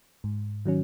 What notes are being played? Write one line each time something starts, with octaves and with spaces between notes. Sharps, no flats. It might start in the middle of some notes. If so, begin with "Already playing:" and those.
G#2
D#3 F#3 C#4